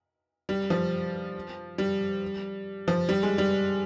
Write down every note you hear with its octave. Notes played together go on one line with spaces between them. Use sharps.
G3
F3
G3
F3
G3
G#3
G3